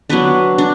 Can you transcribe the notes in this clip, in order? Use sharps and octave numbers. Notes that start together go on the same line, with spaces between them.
F#3 B3 D4 B4
D4